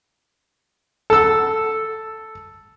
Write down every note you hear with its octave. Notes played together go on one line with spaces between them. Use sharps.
A4 E6